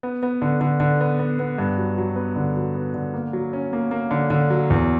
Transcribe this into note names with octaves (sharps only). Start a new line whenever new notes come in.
B3
B3
D3
D3
D3
B3
B3
B3
G2
F#3
F#3
B3
D3
F#3
B3
D3
A#3
F#3
C#4
A#3
A#3
D3
D3
F#3
E2